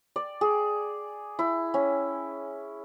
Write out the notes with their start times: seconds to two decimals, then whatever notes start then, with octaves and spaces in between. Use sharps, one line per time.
0.16 D5
0.41 G#4
1.39 E4
1.74 C#4